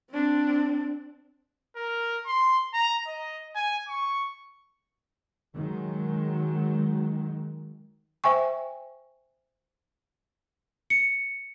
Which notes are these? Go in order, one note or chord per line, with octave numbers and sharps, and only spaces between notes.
C4 D4
A#4
C6
A#5
D#5
G#5
C#6
D#3 F#3 G#3
C5 E5 G5 G#5 C#6
C#7